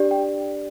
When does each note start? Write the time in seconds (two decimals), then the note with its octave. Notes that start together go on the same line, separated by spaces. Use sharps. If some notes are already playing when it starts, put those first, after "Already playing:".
Already playing: D4 G4 D5
0.11 G5